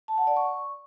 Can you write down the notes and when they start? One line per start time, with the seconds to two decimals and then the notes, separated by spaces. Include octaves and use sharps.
0.08 A5
0.18 F#5
0.27 D5
0.37 C#6